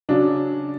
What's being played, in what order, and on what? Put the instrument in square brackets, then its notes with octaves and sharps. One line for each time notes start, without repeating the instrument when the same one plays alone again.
[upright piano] C#3 F#3 D4